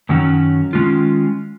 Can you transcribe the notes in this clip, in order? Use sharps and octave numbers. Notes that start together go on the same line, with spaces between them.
F#2 D#3 F#3 C#4 F#4
D#3 G#3 C#4 F4